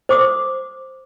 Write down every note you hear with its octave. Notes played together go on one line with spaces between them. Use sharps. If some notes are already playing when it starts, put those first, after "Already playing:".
C5 D6 D#6